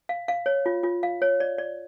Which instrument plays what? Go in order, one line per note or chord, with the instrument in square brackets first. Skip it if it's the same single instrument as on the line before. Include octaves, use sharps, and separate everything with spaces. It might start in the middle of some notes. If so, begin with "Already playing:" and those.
[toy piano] F5
F5
C#5
F4
F4
F5
C#5
D5
D5